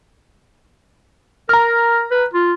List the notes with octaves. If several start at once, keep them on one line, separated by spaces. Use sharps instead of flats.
A#4 A#5 F6
B4
F4